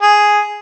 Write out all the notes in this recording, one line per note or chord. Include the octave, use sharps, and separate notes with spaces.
G#4